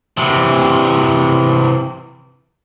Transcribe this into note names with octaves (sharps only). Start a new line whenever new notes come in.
C3 E3